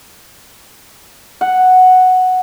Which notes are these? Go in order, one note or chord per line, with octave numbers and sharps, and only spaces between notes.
F#5